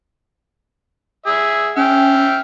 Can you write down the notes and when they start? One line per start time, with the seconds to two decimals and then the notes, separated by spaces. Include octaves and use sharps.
1.26 G#4 E5
1.76 C#4 E5 G5 F6